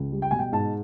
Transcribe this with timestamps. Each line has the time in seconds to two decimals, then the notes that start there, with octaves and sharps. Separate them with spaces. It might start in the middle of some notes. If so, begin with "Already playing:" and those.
Already playing: C#2
0.12 G3
0.22 G5
0.31 B2 G#5
0.39 G5
0.52 G#2 A5